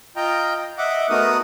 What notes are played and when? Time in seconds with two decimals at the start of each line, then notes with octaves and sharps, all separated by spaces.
0.16 F4 D#5 G5 A#5
0.78 D#5 E5 F#5 D6
1.10 A3 B3 D#4 F#4 A#4 D#6